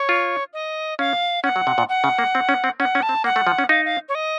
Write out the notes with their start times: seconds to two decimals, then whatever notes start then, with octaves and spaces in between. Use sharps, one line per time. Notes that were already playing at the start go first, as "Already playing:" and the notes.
Already playing: C#5
0.09 F4
0.53 D#5
0.99 C#4 F5
1.43 C#4 F#5
1.56 F#3
1.67 C3
1.78 A#2
1.89 F#5
2.04 C#3
2.19 A#3
2.35 C4
2.49 C#4
2.64 C4
2.80 C#4 F#5
2.95 C#4
3.02 A5
3.09 C4
3.24 A#3 F#5
3.36 A3
3.47 F3
3.58 C#4
3.69 D#4 F5
3.85 F5
4.09 C#5
4.15 D#5